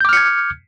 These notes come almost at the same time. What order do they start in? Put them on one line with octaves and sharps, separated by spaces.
G6 D6 F6 C#7 G#6